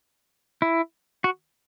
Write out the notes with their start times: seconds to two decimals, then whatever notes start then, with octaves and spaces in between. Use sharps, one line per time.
0.62 E4
1.24 F#4